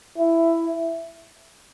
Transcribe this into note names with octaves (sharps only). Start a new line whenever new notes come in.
E4